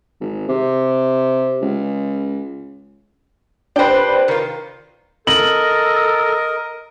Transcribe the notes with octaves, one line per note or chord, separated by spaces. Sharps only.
G#1
C3
C#2
D4 G4 B4 C5 G5
D#3 F4
A4 A#4 D#5 F#7